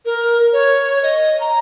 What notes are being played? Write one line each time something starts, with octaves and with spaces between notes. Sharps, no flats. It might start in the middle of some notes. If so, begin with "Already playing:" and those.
A#4
C#5
D#5
A#5